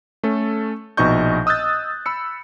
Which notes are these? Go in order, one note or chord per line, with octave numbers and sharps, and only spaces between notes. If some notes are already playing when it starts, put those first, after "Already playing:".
A3 C#4 A4
A#1 B2 D#4 D#5 C#6 G6
D#5 D#6 E6 F#6 G6 A6
B5 E6 C#7